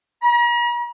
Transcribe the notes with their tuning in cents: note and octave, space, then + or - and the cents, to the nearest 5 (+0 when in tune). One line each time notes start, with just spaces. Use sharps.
A#5 +45